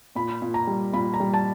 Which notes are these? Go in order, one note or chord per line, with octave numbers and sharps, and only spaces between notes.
A#2 B5
A#2
A#5
G3
A#2 B5
A#5
G3
A5